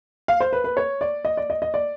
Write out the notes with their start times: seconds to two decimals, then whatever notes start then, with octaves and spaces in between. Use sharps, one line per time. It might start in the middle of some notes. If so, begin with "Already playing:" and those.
0.28 F5
0.40 C5
0.53 B4
0.64 B4
0.77 C#5
1.01 D5
1.25 D#5
1.37 D5
1.50 D#5
1.62 D#5
1.74 D5